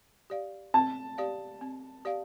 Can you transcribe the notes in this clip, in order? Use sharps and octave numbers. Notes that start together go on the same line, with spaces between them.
G4 D5 F5
C4 A5
G4 D5 F5
C4
G4 D5 F5